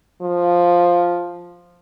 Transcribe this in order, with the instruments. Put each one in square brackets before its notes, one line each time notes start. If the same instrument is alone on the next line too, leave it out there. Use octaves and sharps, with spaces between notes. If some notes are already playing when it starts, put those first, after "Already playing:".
[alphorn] F3